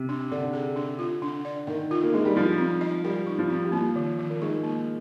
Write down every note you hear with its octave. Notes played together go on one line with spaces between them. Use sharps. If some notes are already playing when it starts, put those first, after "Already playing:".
Already playing: C3
D4
D3 D5
G#4
D4
F4
D4
D5
D#3 A#4
F4
A#3
G#3 D4
G3
F3 D#4
C4
D#5
G3 A#4
D#4
F3
C4
G3
F3 A#3
D#3
D#3
A#3
G#3 D#4
A#3